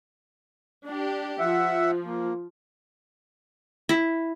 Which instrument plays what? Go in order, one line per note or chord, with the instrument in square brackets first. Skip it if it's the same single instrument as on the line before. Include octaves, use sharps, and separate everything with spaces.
[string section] D4 G4
[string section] F3 [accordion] E5 F#5
[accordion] A#3
[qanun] E4